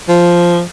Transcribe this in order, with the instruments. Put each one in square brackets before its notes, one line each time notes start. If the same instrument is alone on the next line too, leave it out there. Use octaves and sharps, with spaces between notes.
[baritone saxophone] F3